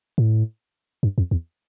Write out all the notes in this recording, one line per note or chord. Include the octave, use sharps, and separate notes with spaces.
A2
G2
F2
E2